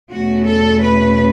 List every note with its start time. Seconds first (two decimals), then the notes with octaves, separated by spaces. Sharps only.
0.12 E2 B2 A3 C#4 F#4
0.47 A4
0.82 B4